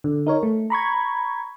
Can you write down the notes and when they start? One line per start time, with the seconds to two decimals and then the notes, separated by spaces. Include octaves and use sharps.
0.04 D3
0.26 D#4 A#4 C#5
0.43 A3
0.70 A#5 B5 C#6 G#6